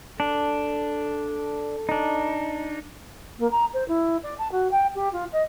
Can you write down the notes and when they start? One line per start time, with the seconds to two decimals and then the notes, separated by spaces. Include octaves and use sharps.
0.20 D4 A4
1.89 D4 D#4
3.38 A#3
3.51 A#5
3.73 C5
3.88 E4
4.23 D5
4.38 A5
4.51 F#4
4.71 G5
4.95 G4
5.12 F4
5.32 D#5